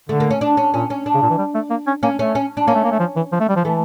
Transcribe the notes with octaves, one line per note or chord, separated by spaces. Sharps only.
D3 A3
A#3
C#4
D4
C#4
A#2 C#4
C#4
D4
C#3
A#2
E3
G3
A3
A#3
C#4
A#3 C#4
A3 C#4
C#4
D4
A#3 C#4
A3
A#3
A3
F3
E3
F3
A3
G3
F3
E3 A3